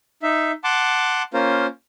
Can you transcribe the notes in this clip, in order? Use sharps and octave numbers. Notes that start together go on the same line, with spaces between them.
D#4 E5
F#5 A5 C6 D6
A#3 C#4 F4 A#4 C5